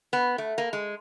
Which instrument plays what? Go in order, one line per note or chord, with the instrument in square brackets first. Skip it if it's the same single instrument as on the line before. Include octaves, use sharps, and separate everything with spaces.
[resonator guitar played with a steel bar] B3
A3
A#3
G#3